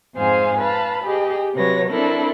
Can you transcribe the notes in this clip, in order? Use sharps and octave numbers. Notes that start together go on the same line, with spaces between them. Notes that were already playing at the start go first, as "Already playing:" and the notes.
F2 G#2 G#4 C5 F5 G#5
B4 F5 A5 B5
G4 G#4 D#5
C3 F#3 B4 C#5 A#6
C4 D4 E4 A4 A#4